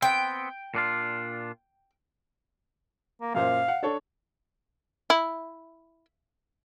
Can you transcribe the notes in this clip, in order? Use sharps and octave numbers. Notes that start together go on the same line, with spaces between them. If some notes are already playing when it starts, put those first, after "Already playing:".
B3 C4 G5
A#2 D4 F4
A#3
F#2 A#2 C5 F5
F#5
D4 A4 C#5
E4